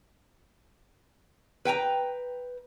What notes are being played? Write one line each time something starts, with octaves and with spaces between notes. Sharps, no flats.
B4 G5 G#5 A#5